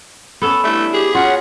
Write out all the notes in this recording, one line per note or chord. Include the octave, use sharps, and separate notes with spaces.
B3 C#4 A4
G3 A3 D4 E4
G4 G#4
C#4 F4 F#4 F#5